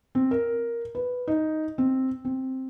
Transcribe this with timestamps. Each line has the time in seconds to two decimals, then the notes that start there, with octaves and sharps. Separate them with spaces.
0.15 C4
0.31 A#4
0.95 B4
1.28 D#4
1.78 C4
2.25 C4